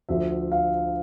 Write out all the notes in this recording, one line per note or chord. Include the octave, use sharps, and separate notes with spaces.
D2 D3 F3 E5
F5